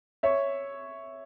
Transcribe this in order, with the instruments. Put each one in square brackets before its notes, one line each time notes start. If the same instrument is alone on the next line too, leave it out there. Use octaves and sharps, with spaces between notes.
[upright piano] C#5 E5